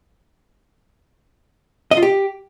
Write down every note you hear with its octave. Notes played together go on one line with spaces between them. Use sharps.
D#5
F4
G4